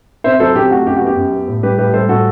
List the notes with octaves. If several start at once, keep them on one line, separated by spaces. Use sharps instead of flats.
C3 C5 E5
F#3 A4 C5
C3 G4
A3 F#4
F#2 G4
B3 F#4
G4
F#2
B3
A2
G3 G4 B4
A2 G4 B4
G3 A4 C5
A2 F#4 A4